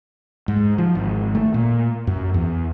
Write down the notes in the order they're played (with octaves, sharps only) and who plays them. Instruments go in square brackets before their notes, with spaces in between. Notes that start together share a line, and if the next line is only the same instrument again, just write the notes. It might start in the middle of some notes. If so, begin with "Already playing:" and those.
[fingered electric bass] G#2
F3
G#1
A3
A#2
F#2
E2